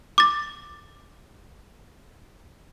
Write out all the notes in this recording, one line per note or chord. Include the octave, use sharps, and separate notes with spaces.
D6 A6